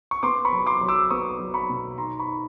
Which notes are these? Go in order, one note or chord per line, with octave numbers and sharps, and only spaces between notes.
C#6
B3 C6 D6
B5 C#6
F#3
C6 D6
F#3
D6 E6
B3 C#6 D#6
F#3
B5 C#6
B2
D#4 A#5 C6
B5 C#6
D#4